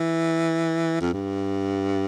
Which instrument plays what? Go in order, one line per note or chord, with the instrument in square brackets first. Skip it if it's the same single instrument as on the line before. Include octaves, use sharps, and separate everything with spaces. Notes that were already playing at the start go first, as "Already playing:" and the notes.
Already playing: [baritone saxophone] E3
F2
G2